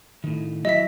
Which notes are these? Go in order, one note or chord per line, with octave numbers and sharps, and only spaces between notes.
A2 D#3
F#3 E4 D#5 E5 B6